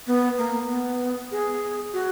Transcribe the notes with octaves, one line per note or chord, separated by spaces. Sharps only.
B3
A#3
B3
G#4
F#4